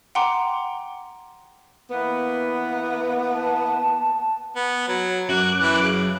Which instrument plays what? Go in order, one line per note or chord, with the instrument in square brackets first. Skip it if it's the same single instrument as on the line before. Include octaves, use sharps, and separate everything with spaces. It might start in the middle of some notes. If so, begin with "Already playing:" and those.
[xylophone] F#5 G5 A#5 C6 D6
[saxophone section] E3 A#3 B3
[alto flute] A5
[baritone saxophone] B3
F#3
[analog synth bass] F#2 [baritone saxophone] F#4 [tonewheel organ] D6 F#6
[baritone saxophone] E3
C#3